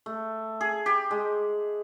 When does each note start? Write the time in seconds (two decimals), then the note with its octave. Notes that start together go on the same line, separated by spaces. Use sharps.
0.06 A3
0.61 G#4
0.86 G4
1.11 G#3